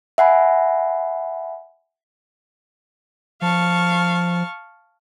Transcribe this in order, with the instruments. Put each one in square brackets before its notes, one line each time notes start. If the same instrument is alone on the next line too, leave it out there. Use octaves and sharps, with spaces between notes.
[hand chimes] E5 F#5 G#5 B5
[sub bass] F3 [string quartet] F5 A5 C#6